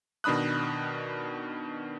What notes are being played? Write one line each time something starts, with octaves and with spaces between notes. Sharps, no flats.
B2 D#3 D4 B5 D#6 F#6